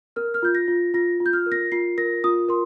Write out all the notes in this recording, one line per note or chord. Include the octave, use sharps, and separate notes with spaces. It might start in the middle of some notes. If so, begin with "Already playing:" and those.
A#4 F6
F6
F4 G6
A#6
F4
F4 A#6
F4
G6
F6
A#4
A#6
F4 C7
A#4 A#6
F4 D#6
A#4 C6